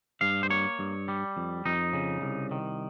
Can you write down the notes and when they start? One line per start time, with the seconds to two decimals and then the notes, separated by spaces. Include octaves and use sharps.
0.21 G2 F5
0.43 C5
0.50 A#3 C#5
0.79 G2
1.08 G3
1.37 F2
1.66 F2 D#4
1.93 C#3
2.22 C2
2.51 D#3